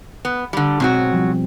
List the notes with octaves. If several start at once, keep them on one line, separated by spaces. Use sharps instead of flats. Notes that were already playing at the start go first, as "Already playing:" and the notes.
B3
D3 G3
G#2 B2 F#3 C4 F#4
F3 G3